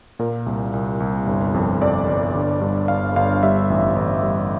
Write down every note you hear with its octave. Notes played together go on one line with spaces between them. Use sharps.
A#2 A#4
C2
C2
C2
G1
F2
F2 D5
G1
D3
G2
G1 F5
G1 F5
G3 E5
A1
A1
G3